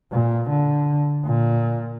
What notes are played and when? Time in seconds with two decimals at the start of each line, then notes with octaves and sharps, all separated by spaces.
0.12 A#2
0.49 D3
1.26 A#2